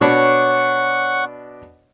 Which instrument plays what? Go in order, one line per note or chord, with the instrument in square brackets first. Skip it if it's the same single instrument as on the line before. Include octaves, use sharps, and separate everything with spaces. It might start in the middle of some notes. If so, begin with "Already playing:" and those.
[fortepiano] B2 D4 B5 [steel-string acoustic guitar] C#5 [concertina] F#5 C#6